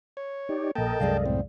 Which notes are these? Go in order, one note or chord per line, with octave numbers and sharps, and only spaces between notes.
C#5
D#4 G4 D5
A#1 A#3 A4 A#4 D#5 G5 A5
C2 F#2 G#3 G#4 D5 F5
A2 C4